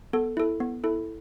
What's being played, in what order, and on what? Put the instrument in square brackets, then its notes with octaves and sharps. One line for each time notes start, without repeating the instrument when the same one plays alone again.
[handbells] B3 A4
E4 A4
B3
E4 A4